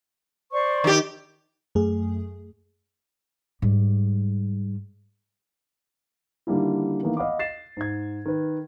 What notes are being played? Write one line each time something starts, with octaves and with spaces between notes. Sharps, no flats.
C5 D5 C#6
D#3 G4
F#2 A3 G#4
G#2 G3
D3 D#3 G3 A#3 E4
D#3 E3 A#3 B3
D#5 F5 F#5 B5 D6
A6 C7 E7
G#2 G#6
D#3 B4